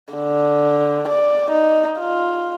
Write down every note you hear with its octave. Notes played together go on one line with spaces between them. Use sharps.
D3
D5
D#4
F4